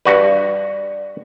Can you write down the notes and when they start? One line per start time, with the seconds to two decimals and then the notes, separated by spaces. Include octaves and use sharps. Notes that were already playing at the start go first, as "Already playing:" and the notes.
0.05 G2 F#4 B4 D5